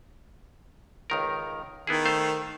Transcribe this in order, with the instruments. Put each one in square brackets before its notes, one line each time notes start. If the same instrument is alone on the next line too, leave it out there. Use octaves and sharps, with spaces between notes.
[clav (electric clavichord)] C#2 D#3 A#4
[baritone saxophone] D#3 [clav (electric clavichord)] B3 E4 G#4
[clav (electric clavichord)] A3 C5 F5